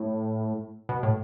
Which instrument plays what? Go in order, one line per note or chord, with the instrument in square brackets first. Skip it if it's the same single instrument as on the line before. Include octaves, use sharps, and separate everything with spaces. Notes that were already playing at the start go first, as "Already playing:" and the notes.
Already playing: [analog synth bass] A2
B2
A2